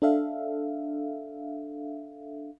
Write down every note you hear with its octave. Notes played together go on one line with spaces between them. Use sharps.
D4 A4 E5 F5